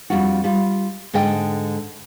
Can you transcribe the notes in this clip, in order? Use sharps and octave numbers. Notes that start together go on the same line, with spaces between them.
F2 G3 D4 F4 F#4
G3 F4
G#2 D3 A4 D#5 G5